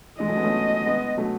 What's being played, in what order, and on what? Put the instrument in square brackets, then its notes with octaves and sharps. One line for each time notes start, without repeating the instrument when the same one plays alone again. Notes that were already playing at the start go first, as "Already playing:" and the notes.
[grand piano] E3 G#3 [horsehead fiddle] D#5
[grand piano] F#3 A3
G#3 B3
A3 C#4
G#3 B3
F#3 A3